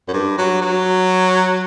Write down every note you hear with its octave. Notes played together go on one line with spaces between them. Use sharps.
F#2
G2
F#3
F#3